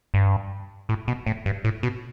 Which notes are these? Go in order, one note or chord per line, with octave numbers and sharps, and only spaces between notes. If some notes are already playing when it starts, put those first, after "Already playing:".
G2
A2
B2
A2
G2
A2
B2